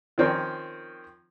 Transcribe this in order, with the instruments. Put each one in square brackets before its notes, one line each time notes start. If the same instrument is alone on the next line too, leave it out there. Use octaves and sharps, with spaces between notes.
[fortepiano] D#3 F3 C4 C#4 A#4